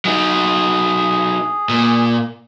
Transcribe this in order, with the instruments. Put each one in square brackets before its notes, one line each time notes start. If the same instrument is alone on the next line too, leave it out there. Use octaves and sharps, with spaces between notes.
[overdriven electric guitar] F#3 D#4 [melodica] G#4
[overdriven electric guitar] A#2